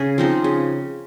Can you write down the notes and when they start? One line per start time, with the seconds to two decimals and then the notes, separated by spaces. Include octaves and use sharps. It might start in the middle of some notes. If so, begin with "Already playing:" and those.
Already playing: C#3 G#4
0.18 F3 C4 D#4
0.44 C#3